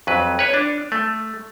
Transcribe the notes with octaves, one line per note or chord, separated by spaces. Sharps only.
F2 F#3 B4
B4 C#5
D4
A3